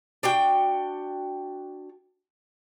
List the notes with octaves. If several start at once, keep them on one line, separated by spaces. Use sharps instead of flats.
D4 F#4 G5